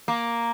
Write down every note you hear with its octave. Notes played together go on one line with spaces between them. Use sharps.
A#3